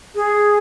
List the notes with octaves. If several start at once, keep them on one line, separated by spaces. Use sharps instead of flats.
G#4